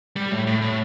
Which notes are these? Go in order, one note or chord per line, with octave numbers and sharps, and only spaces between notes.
G3
A2
A2
A2